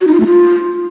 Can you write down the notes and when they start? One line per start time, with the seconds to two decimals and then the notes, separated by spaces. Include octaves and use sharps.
0.01 F#4
0.07 D#4
0.14 F4
0.20 A3
0.27 F4